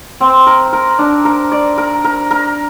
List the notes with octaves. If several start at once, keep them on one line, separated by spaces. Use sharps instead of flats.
C4
A#4
A#4
D4
A#4
D5
A#4
A#4
A#4